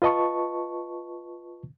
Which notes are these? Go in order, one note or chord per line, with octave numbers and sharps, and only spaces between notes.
F4 B4 D#5 A5 C#6